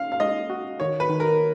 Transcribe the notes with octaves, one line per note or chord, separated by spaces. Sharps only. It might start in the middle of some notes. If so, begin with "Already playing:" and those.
Already playing: C#4 F5
F5
G#3 D#5
F#4
D#3 C#5
B4
D#3
A#4